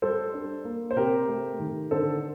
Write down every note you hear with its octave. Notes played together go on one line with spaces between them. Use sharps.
G3 A4 C5
D4
A#3
C5
C3 G4 A#4
A3
D#3
D3 A4 C5